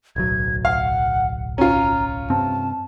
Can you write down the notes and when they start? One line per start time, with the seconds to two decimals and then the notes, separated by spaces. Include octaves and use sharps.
0.16 D1 B1 F#3 G#6
0.65 F5 F#5
1.58 C#4 F4 A#5
2.30 G2 C3 C4 A5